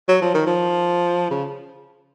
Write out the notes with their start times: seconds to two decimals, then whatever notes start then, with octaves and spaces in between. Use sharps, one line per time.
0.08 F#3
0.22 F3
0.34 D#3
0.47 F3
1.31 C#3